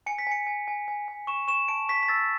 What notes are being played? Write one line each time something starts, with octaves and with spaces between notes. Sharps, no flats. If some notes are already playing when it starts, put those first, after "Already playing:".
G#5 C#7
B6
G#5 C#7
G#5
G#5
G#5
G#5
C#6 E7
C#6 E7
A5 D7
C#6 B6
B6
E6 A6